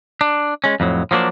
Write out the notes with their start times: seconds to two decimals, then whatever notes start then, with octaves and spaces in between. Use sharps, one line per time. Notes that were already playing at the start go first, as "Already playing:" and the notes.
0.21 D4
0.64 G#3 C#4
0.80 F2 A2 F#3
1.11 F3 F#3 A#3 D4 C5